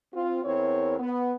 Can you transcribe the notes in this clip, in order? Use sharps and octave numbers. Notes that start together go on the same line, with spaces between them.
C4 F4
E2 C4 E4 A#4 C#5
B3